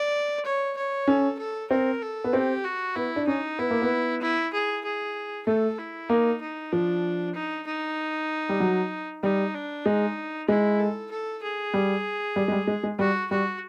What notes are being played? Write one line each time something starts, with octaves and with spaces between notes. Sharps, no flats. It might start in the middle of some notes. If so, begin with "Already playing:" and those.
Already playing: D5
C#5
C#5
C#4 A4
A4
C4 A#4
A4
B3
C4 G4
F#4
B3 E4
D4
C#4 D#4
B3 E4
A#3
B3
E4
G#4
G#4
A3 A4
E4
A#3 D#4
D#4
F3 D4
D#4
D#4
G3
F#3
G3 D#4
D4
G#3 D#4
G#3 E4
A4
A4
G#4
G3
G3
G#3
G3
G#3
G#3
G3 F#4
G3 F#4